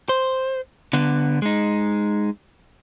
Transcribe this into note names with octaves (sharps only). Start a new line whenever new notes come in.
C5
D3 B3
G#3 D#4